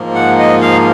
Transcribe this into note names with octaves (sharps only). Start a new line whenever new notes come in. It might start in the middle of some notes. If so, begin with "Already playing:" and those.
Already playing: G#2 F3 A#3
F#5
D#5
F5